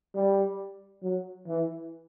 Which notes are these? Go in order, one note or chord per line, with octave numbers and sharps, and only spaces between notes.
G3
F#3
E3